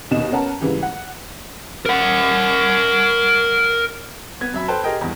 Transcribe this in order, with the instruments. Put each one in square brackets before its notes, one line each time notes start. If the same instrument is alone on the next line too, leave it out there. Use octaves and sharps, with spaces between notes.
[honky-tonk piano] D#2 B2 D#4 D#5 E7
B3 C#4 A#4 F#5 A5 A#5
G#2 C#3 E3 G3
F#5
[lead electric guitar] A#4 F#5
[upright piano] B3 G#6
F#2 E5 B5
A4 B4 C5 G5 A5
G4 G#4 A#4 D#5 G5
E2 G2